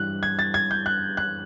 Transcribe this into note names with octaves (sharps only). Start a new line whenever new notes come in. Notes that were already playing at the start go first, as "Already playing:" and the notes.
Already playing: G2 E3 G3 F#6
G#6
A6
G#6
G6
F#6
F#6